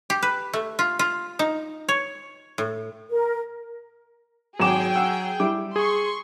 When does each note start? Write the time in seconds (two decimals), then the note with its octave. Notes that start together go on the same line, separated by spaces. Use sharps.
0.10 G4
0.22 B4
0.53 A3
0.79 F4
0.99 F4
1.39 D#4
1.88 C#5
2.58 A2
3.10 A#4
4.59 G#1 F#3 G#4 G5 D6 E7
4.96 F#5 E6
5.40 G3 E4 D6
5.76 G#4 C6 C#6